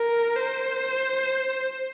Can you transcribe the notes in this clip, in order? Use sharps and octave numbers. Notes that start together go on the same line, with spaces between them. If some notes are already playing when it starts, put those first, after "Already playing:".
Already playing: A#4
C5